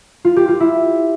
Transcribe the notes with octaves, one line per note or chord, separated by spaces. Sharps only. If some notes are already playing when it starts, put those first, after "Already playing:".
F4
G4
F4
E4